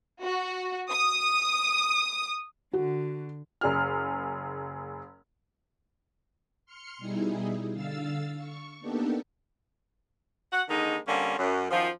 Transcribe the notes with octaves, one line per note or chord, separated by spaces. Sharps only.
F#4
D#6
D3 F#4
F#1 G#4 F6
C6 F6 C#7
B2 G3 D#4 E4 G#4
D3 F5 E6 A6
C#6
A#3 B3 D4 D#4 G4 A4
F#4 F#5
D3 D#3 G#3 A#3 D#4
D3 G3 A#3 C4 C#4
F#2
F#2 D#3 F3